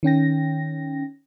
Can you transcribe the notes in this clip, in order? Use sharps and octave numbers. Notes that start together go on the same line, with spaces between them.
D#3 C#4 G5 A#6